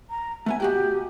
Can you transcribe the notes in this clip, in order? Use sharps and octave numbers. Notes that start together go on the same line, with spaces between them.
A#5
A3 B3 E5 G#5
B2 F#4 G4 G5